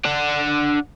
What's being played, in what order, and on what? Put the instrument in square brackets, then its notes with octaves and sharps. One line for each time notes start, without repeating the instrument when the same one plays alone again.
[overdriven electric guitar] D4 F#5